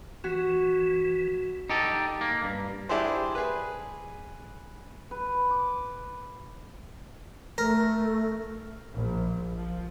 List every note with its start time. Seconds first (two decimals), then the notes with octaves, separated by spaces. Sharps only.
0.24 E3 F#4
1.70 D#4 G4 A4
2.21 A#3
2.44 G2
2.89 D4 E4 G4 G#4 C5
3.35 G#4 B4
5.11 B4
5.51 D6
7.58 A3 A#4
8.91 A#1
9.54 F3